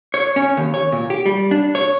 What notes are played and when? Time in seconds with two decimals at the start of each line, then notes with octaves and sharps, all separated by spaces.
0.14 C#5
0.36 C#4
0.57 D#2
0.74 C#5
0.92 A#2
1.10 G4
1.26 G3
1.51 D4
1.75 C#5